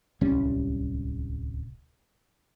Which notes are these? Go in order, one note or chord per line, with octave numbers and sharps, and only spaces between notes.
D1 C2 G3 C#4